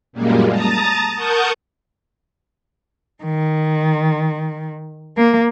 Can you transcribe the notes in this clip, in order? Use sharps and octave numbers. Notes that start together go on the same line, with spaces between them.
F#2 A#2 G3 G#3 A#3
A5 A#5 D#6 A6
A#4 F#5 A5 C#6 D#6 G6
D#3
A#3